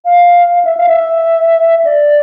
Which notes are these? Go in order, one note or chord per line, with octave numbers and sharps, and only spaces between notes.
F5
E5
F5
E5
D5